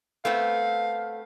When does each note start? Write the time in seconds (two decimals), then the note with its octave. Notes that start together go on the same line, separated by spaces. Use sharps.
0.25 A3 B3 C4 F5